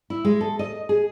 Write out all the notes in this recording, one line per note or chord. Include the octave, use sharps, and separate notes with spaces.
E4
G#3
A4
D#5
G#4